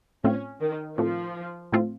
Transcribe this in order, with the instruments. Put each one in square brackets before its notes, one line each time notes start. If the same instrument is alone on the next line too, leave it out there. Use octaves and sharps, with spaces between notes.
[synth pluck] A2 A3 C4 F4 [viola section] C#4
[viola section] D#3
[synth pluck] A2 A3 C4 F4 [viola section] F3
[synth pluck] A2 A3 C4 F4